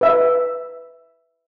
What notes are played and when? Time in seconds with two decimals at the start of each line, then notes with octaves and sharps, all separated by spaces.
0.01 B4 E5